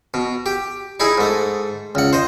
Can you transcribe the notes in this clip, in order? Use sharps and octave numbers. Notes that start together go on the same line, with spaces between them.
B2
G4
D#4 E4 G#4
G#2 A3
C#2 F#5
C5 D#5